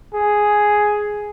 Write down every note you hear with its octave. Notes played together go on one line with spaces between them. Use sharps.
G#4